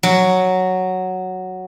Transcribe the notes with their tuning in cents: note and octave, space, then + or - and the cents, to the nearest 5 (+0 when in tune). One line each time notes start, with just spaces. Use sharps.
F#3 +0